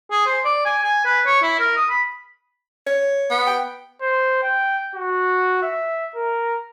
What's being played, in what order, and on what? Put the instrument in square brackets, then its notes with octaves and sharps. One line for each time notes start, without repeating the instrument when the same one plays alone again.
[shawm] G#4
C5
D5
G#5
G#5
B4
C#5
E4
A#4
D#6
B5
[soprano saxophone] C#5
[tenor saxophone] B3
[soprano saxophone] G5
[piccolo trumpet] C5
G5
F#4
E5
A#4